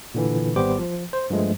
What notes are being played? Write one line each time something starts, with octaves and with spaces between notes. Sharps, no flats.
A#2 D3 E3
G#1 G3 B3 G4 C5 D6
F3
C5
G2 F3 G#3 A3